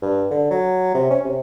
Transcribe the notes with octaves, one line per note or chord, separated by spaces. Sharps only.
G2
D3
F#3
C3
C#4
C3